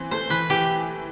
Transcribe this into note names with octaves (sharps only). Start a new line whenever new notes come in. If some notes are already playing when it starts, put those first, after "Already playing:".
Already playing: E3 C4
A3 C5
E3 B4
E3 G4